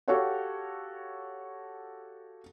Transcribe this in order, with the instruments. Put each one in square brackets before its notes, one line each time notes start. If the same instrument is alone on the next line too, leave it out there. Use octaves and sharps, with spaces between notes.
[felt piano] F#4 G4 A4 C#5 F5 F#5